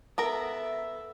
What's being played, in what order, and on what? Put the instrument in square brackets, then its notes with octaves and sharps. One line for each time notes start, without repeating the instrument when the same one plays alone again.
[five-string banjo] B3 A#4 A#5 [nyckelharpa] A4 E5